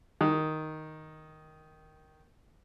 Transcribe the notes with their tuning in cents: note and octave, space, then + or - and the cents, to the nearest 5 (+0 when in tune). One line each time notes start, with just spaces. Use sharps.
D#3 +0